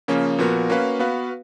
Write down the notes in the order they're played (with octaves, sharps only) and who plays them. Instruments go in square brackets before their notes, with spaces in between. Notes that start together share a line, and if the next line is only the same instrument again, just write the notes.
[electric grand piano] C#3 F3 A#3 C#4
A#2 F3 B3 F#4 A#4
A#3 C#4 F#4 B4 F5
B3 F#4 B4 F5